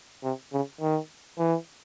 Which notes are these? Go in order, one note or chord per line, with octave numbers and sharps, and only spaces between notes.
C3
C#3
D#3
E3